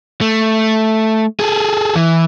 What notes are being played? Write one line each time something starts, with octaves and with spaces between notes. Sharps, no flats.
A3
G#4 A4
E3